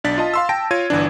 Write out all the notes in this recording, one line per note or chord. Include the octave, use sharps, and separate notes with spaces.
B1 D4 D5 A6 B6
F4 D#5 A5
F5 C6 E6
G5 A5 A#6 D7
F4 C#5 G#6 D#7
G1 E3 D4